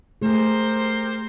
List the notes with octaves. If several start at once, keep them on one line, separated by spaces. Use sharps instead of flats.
A3 G4 G#4 A#4 C5